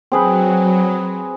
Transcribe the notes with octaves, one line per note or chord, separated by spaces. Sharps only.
F#3 C4 G#4 B4